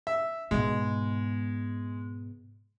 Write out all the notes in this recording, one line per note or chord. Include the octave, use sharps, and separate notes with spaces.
E5
G#2 B2 G#3